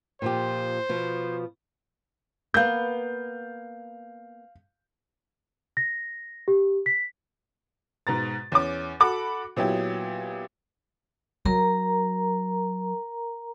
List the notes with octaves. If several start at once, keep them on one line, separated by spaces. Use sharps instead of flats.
A#2 F3 G4 C5
B2 F3
A#3 B3 F5 G6
A#6
G4
B6
G#2 B2 A#5 A6
E2 C#4 D6
F#4 A4 F#5 B5 D6
A#2 F#3 B3 E4 G4
F#3 A#4 A#5